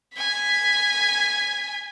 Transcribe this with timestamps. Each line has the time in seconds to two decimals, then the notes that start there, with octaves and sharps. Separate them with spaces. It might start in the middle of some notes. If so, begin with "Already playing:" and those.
0.15 G#5 B6